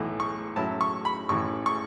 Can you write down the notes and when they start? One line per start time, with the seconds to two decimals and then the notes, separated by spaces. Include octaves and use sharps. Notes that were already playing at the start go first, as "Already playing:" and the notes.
Already playing: B1 A2 E3
0.20 C#6
0.56 A2 F#3 C#4 E4 A5
0.81 C#6
1.05 B5
1.29 A1 A2 E3 C#6
1.66 C#6